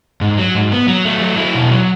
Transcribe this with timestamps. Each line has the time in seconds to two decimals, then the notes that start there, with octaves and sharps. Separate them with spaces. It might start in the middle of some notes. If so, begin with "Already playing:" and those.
0.21 G#2
0.38 F#3
0.55 G#2
0.72 B3
0.88 F#3
1.05 A3
1.21 F#3
1.38 E4
1.55 B2
1.71 F#3